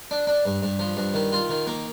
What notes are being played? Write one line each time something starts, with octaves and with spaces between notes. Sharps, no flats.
D4
D4
G2
G2
F3
G2
D#3
F4
D#3
A#3